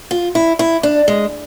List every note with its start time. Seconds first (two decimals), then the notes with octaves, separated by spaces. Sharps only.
0.11 F4
0.35 E4
0.59 E4
0.83 D4
1.08 G#3